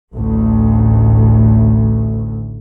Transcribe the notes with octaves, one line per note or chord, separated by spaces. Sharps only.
A1 D2